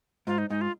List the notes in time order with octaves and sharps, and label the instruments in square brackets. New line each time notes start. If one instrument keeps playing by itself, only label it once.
[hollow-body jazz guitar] G#2 [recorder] F4
[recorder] D#4
[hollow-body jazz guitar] G#2 [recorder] D#4
[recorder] F4